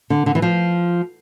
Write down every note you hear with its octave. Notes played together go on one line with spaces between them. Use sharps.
D3
D3
E3
F3